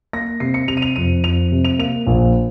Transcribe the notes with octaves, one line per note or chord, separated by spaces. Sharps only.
A#3 A#6
C3 C7
C#7
C3 F7
D#7
F7
F2 D#7
F2 F7
C3
F7
A#3 F7
A#1